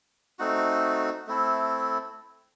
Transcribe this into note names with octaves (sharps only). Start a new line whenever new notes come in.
A3 C4 D#4 F#4
A3 C4 E4 A4